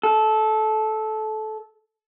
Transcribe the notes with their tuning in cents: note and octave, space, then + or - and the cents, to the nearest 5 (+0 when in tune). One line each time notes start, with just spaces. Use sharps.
A4 -20